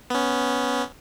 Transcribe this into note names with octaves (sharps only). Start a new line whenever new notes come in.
B3 C#4